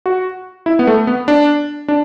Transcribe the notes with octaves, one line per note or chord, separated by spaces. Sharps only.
F#4
E4
B3
A3
B3
D4
D4